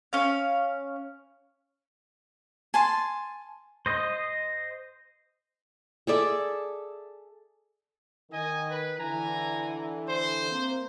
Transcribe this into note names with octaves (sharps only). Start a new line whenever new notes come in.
C#4 F5
G#5 A5 C6
C5 D#5
G#4 A4 D5 E5
D#3 D#5 G#5
B4
D3 E3 G#5 A#5
C5
A#3 C4